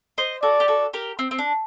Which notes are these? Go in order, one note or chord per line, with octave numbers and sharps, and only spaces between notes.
C5 D#5
F#4 A4 D5
G4
F#4 A4
G4 A#4
C4
C4
D4